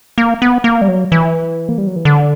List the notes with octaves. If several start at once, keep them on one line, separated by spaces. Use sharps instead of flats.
A#3
B3
A#3
G3
F#3
E3
A#3
G3
F#3
E3
D3